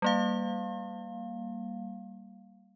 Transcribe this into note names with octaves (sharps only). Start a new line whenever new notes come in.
G3 A#3 F5